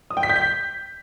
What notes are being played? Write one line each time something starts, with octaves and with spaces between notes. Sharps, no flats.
D#6
G5
B6
G6
B6